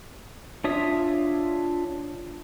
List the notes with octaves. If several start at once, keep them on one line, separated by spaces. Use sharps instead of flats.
D4 F4 C#5 E5 D#6